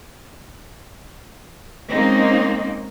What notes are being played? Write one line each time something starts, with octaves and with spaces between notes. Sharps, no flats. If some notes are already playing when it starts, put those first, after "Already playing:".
G#3 A#3 C4 C#4 D#4